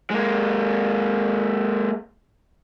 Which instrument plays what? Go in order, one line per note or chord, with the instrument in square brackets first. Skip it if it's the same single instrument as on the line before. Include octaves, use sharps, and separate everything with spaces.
[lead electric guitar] G#3 A#3